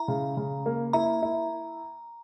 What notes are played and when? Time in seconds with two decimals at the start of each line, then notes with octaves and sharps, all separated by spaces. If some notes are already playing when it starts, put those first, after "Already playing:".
Already playing: E4 A#5
0.08 C#3
0.37 C#3
0.66 A#3
0.93 E4 A#5
1.22 E4